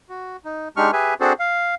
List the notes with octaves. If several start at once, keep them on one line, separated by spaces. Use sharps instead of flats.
F#4
D#4
G#3 D4 D#4 G4 C#6 F6
G4 G#4 B4 E5 G#5
C4 D4 F#4 G#4 A4 C5
F5